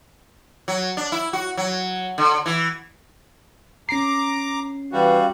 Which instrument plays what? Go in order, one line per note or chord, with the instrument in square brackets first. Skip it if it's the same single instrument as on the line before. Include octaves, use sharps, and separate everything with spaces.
[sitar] F#3
D4
E4
F#4
F#3
D3
E3
[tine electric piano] C#4 C7 [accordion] A#5 D6
[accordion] E3 [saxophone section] G3 F#4 [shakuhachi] F5